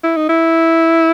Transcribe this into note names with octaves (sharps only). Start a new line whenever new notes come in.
E4
D#4
E4